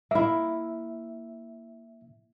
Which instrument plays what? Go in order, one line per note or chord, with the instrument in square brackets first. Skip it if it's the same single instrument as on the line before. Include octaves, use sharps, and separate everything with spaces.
[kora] A#3 E4 [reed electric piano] E5